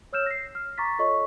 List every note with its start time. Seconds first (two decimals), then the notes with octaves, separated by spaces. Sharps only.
0.13 C#5 E6 F6 G6 E7
0.26 A#6 C7
0.55 F6
0.78 A#5 C#6 D6 A6 B6
0.99 F4 A4 C#5 D#5 C#6